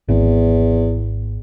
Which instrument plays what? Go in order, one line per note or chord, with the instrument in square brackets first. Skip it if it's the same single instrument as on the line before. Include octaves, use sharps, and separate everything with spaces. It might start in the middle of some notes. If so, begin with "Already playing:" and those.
[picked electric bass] G#1 [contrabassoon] E2